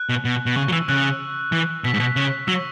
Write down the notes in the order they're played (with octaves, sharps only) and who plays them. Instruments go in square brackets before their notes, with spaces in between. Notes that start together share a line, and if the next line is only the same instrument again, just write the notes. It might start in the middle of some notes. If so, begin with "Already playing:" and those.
Already playing: [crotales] F#6
[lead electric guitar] B2
B2
B2
[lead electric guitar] C#3 [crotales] C#6
[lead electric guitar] F#3
[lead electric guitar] E3 [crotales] E6
[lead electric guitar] C#3 [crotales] F#6
[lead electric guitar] E3
[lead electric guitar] B2 [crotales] B6
[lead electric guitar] G#2
B2
C#3
[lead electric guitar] F#3 [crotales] E6
[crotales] C#6